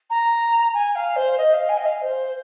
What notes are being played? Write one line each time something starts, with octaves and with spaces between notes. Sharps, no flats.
A#5
G#5
F5
C5
D#5
F5
G#5
D#5
F5
C5